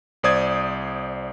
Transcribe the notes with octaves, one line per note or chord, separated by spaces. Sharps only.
C2 C5 D5 D#6 G#6